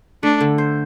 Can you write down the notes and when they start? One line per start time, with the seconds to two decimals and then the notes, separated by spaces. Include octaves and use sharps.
0.23 A3 D4
0.41 D3
0.58 C5